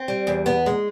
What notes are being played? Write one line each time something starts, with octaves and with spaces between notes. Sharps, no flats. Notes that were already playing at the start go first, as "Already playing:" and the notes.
Already playing: C4
G3
E2
B3
G#3